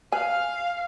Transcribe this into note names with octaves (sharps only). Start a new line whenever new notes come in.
B4 F5 G#5